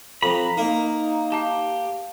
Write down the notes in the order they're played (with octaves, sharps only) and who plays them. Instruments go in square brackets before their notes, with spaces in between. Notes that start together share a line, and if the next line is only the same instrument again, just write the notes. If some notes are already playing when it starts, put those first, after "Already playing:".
[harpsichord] F2 [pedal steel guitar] A#5 B5
[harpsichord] A#3 [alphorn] D#4
[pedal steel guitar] G4 [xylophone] F5 A5